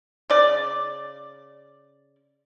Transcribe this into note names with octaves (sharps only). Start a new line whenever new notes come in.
C#3 D5